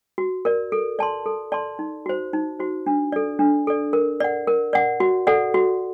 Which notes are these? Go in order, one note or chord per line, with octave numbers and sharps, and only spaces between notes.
F#4
A#4 D5
A4
D5 A5 C6
A4
D5 A5 C6
D#4
F#4 C5
D#4
F#4 C5
D4
A4 D5
D4
A4 D5
A#4
D5 F#5
A#4
D5 F#5
F#4
A4 D5 F#5
F#4